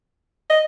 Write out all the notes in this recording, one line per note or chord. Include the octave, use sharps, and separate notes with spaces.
D#5